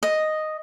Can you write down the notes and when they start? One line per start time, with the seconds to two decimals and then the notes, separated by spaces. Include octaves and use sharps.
0.03 D#5